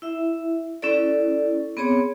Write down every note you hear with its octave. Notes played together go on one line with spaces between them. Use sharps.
E4 E5
C#4 E4 A4 D5
B3 C4 G#4 C#5